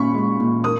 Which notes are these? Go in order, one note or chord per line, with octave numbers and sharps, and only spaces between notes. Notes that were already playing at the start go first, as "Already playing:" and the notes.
Already playing: A#2 C#4 B5 C#6
G#3
A#2
A#3 D#6